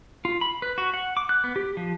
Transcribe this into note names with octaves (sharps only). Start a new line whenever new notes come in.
F4
B5
B4
F#4
F#5
D6
F#6
B3
G4
F3